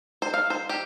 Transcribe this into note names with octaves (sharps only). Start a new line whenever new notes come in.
C5
F5
C5
G4